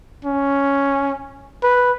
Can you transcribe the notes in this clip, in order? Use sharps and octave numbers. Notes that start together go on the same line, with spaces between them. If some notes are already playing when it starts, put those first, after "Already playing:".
C#4
B4